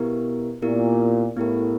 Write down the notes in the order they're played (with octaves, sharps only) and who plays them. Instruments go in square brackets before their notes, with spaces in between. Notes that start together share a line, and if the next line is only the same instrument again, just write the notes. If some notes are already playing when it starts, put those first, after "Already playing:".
Already playing: [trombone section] B2 [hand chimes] B3 E4 G4 A#4
[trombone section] A#2 [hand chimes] B3 E4 G4 A#4
[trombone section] A2 [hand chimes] B3 E4 G4 A#4